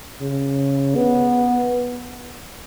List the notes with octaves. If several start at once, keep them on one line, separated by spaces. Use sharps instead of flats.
C#3
B3